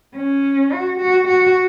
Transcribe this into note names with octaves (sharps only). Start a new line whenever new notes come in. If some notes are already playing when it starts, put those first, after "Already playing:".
C#4
F#4
F#4
F#4